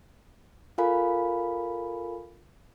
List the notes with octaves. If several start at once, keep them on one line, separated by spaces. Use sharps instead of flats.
F4 A4 A#4 F5 G#5 B5